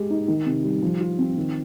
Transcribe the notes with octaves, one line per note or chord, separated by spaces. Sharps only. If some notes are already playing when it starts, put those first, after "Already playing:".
Already playing: G#3 G4
D#4
D#3
C3
G3
F3
F4
C4
D#3